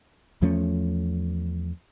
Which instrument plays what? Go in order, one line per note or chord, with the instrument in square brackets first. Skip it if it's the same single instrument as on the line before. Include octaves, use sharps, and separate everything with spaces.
[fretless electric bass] E2 F3 A3 C#4